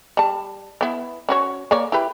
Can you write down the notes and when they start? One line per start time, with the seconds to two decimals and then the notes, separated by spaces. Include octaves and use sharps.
0.17 G3 A5
0.81 B3 E4
1.29 C#4 F#4 C#5
1.71 A#3 C#5 D5
1.92 E4 G4 B4